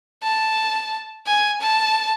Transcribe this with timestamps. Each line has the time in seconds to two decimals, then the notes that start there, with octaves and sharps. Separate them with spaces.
0.23 A5
1.27 G#5
1.61 A5